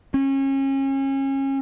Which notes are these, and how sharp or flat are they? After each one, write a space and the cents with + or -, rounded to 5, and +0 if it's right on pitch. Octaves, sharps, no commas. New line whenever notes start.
C#4 -30